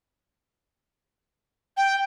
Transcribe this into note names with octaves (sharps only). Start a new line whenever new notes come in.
G5